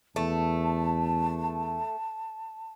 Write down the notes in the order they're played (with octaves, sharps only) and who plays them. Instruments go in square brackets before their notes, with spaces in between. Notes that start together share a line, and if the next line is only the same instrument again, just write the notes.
[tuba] E2 [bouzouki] A3 [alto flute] A5